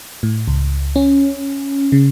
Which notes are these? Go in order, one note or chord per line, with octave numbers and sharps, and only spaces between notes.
A2
C#2
C#4
C#3